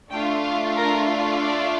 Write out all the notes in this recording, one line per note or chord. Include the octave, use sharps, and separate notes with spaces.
A3 D4 F4 G5
F5
A#4
D5